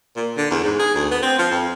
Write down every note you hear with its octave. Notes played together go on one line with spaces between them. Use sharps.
A#2
D3
E2
G#2
G#4
D2
B3
C4
F3
F2